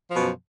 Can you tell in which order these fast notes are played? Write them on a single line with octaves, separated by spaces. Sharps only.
F3 B2 F#2